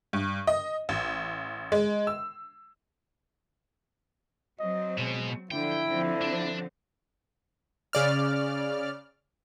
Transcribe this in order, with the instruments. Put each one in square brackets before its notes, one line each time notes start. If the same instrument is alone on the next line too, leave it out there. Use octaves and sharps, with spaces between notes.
[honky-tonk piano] G2
D#5
A1
G#3
E6
[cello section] F#3 C4 [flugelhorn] D#5
[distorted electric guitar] B2 [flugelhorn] G#3
[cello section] D3 F3 [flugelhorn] E4 [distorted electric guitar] G5
[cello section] D3 F3 C4
[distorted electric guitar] D4
[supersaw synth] C#3 D5 F6